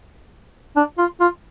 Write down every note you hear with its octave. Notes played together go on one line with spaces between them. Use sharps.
D4
F4
F4